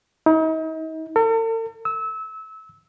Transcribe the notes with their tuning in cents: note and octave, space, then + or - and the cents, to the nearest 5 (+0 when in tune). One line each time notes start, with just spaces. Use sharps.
D#4 +40
A4 +45
E6 -25